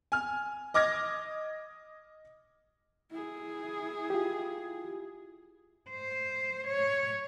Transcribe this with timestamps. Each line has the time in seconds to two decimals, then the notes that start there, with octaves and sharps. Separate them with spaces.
0.12 G#5 F6
0.74 D#5 D6 F6 G#6 A#6
3.11 E4 G#4
4.10 F4 G4
5.90 C5
6.68 C#5